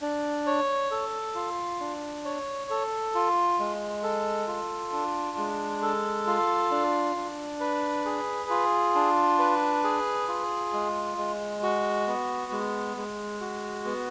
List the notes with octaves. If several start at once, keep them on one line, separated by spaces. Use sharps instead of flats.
D4
C#5
A4
F4
D4
C#5
A4
F4
G#3
A4
F4
D4
G#3
A4
F4
D4
D4
B4
G#4
F4
D4
B4
G#4
F4
G#3
G#3
F#4
B3
G#3
G#3
F#4
B3